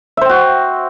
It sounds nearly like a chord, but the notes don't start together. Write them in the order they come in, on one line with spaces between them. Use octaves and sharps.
E5 C5 G5 F#4